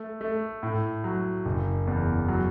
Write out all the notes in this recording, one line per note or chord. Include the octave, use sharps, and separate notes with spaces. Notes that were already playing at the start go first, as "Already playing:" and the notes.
Already playing: A3
A3
A2
F#3
F#1
E2
F#3